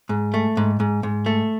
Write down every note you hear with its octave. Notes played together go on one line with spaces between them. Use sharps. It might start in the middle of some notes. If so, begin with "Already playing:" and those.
G#2
A3
G#2
G#2
G#2
A3